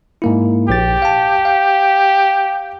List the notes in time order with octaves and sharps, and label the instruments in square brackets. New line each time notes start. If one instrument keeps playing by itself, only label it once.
[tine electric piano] G#2 A#3 E4
[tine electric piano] A#1 A6 [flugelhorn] G4
[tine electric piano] F5 A5
F5